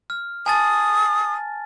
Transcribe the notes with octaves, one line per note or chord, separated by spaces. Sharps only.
F6
G#5 A5 D#6 A6